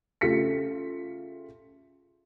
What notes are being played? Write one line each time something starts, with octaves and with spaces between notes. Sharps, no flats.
C#3 A3 F4 G4 B6 C#7